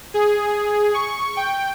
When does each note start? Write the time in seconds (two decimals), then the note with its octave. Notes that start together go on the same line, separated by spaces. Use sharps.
0.14 G#4
0.94 C#6
1.37 G5